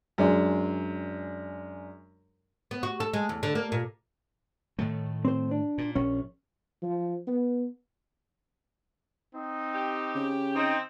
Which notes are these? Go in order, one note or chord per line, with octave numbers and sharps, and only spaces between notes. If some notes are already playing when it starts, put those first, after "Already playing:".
F#2 G#3 D4
B3
F#4
A4
G#3
E2
D3
A#3
A#2
A2 D#3 A3
C4 C5
D4
A#2
A#1 C#4
F3
B3
C4 D#4
G4
C#3
C4 D#4